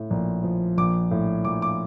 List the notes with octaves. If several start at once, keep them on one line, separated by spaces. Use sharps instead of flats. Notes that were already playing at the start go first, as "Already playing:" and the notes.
Already playing: A2 A3
A#1
F3
A#1 D6
A2
A#1 D6
D6